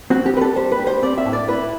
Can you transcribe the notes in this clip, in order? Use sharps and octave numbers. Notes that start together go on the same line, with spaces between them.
C4 F#4
G4
G3 B4
A4
G3 C5
B4
G3
C5
C4 D5
E5
A2
D5
E4 B4